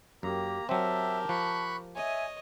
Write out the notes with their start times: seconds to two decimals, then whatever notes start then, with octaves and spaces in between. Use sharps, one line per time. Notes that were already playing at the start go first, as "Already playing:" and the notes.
0.23 F#2 A#3 G4 A#5
0.69 F#3 C4 G4 A#4 E5 A5
1.29 F3 B5 C#6 F#6
1.96 C#5 D#5 E5 G#5